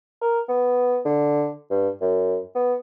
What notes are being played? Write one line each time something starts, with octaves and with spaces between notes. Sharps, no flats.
A#4
B3
D3
G2
F#2
B3